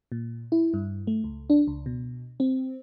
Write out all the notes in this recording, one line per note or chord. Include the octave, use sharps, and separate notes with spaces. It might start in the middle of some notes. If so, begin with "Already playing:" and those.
A#2
E4
G2
A3
C#2
D4
C#2
B2
C4